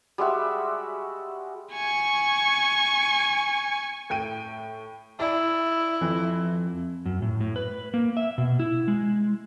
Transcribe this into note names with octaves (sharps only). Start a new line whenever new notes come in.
G3 G#3 F#4 E5
G#5 C#6
A2 G5 D#7
E4 D5
F2 E3
F#2
A2
A2
B4
A#3
E5
B2
E4
G#3